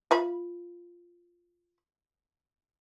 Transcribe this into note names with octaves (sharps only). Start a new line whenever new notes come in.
F4 E5 B5